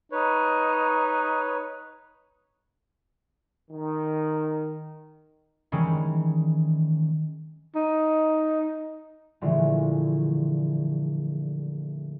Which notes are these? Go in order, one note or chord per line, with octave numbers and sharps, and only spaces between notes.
D#4 B4 C#5
D#3
D#3 E3 G3 G#3 C#4
D#4
A#1 D3 E3 F3 G#3 A3